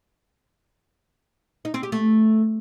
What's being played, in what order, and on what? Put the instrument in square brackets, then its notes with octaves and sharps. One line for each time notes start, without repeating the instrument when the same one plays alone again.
[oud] D#4
C4
G4
A3